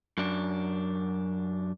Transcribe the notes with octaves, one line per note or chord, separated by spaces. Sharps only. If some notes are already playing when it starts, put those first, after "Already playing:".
F#2 D4